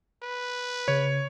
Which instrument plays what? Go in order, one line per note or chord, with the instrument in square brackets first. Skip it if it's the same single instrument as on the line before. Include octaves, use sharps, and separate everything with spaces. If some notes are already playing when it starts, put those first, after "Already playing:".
[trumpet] B4
[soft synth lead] C#3 [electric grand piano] C#5